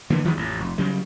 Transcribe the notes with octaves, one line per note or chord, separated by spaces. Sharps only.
D3 E3 A#3 B3
E2 D#3 E3 G#3
A1 F2
F1
C#3 F#3 G3